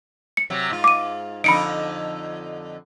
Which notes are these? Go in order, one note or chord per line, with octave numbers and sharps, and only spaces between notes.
C#7
C3 F#3
G#2 F4
D6 D#7
F2 D3 D#4 B5 C#7 D7